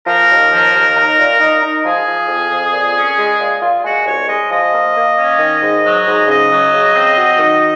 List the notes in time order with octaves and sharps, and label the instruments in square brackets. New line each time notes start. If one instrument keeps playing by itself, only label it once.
[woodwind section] F3 A#4
D#2
F3
D#2
D#4
A#2
D#4
D#4
F3 G#4
F3
F2
F2
A#2
C#4
G#3
A#2
A#2 F4
G#3 F#4
C2 C#5
G#3 D#5
F3 D#5
A#3
A#3
C#4
D#3
G#2
F#3
G#2
C#3 D#5
F#3
C#3
C4
F#3
D#3